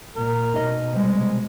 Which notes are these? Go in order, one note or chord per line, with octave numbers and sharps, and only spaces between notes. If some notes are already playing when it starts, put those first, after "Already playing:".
A#2 A#4
B2 D#4 D#5
C3 G3 G#3